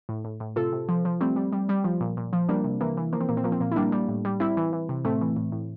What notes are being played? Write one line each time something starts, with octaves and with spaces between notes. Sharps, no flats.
A2
A2
A2
C3 F4 A4
C3
F3
F3
G3 A3 C4
G3
G3
G3
F3
A#2
A#2
F3
G3 A#3 D4
C3
E3 A#3
E3
F3 A#3
C4
A#2 A#3
C4
F3 A#3
C4
A#2 A#3
E4
G3 A#3 D4
G3
A2
G3
G3 C4 E4
E3
E3
C3
A2 A3 C4
E3
A2
A2